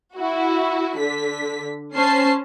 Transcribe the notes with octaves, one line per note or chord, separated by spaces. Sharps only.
E4 F#4
D3 B6
C#4 C5 A5 C7